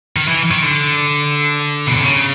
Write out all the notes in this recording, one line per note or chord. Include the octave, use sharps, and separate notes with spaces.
D#3
E3
D#3
D3
B2
C3
C#3